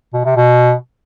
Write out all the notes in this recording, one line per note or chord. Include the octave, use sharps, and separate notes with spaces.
B2
C3
B2